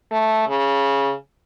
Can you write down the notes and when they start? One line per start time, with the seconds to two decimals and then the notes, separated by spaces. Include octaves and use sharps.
0.12 A3
0.48 C#3